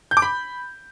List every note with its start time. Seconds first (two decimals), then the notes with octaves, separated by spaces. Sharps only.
0.11 G6
0.17 D6
0.22 B5